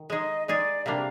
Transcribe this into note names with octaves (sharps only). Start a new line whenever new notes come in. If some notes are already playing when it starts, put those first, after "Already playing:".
Already playing: D#3
G#3 D#4 G#4 D#5
G#3 D#4 G#4 D5
C3 G3 A#3 D4 F5